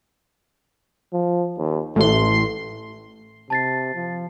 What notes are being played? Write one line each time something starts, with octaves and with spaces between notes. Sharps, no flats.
F3
D#2
A1 A3 C6
C3 A5 A6 C7
F3